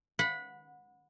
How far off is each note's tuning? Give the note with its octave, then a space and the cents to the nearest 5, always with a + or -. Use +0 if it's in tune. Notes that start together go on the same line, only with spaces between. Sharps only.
F#5 -25 B5 +0